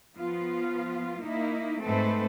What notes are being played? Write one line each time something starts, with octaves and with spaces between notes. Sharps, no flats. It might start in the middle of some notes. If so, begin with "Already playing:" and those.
F3 B3 F4
A#3 D#4 E4
G#2 A3 C4 A4 B4 C5